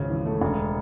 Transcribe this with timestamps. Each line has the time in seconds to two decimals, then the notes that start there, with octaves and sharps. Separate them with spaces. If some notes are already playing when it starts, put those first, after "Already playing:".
Already playing: G#1 C#2 C#3
0.10 E3
0.26 A3
0.41 E1